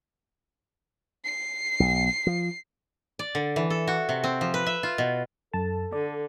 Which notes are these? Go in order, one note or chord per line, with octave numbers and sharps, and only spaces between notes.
C7
B1
F3
D5
D3
E3
A4
F#4
C3
C4
F3
B4
E5
F4
B2
F#2 A4 A5
D3 D5